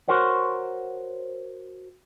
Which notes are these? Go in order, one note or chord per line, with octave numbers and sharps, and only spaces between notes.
F#4 A#4 C5 C#5 F#5